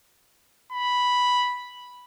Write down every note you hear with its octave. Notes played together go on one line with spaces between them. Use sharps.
B5